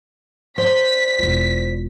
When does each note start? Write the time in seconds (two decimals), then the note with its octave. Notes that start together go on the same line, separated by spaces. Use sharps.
0.58 C5 D5 B6
1.19 E1 F4